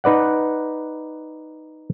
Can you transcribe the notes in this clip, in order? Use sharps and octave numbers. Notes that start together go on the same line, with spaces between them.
D#4 B4 D5 F#5